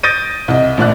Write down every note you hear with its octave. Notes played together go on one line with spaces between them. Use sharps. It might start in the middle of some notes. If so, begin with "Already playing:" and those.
D#6 G6 A6 A#6 D7 D#7
C2 D#5
A#1 A2 D5 F#6